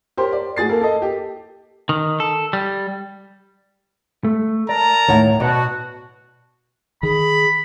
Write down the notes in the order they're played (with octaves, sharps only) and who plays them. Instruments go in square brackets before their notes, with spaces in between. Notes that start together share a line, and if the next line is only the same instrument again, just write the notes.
[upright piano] G4 A#4 C5 C#5
D5
A2 F#4 G#4 A6 C7
A#3 A4 A#4
A4 D#5
G4
[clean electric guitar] D#3
A4
G3
A3
[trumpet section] A#4 A5 A#5 [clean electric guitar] D5
[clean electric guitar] D#2 D#3 F#5 [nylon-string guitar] A2 C#5
[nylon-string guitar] B2 [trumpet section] F#4 [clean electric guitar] D5 D#5 A5
[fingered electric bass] D#3 [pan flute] G#4 [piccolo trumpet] B5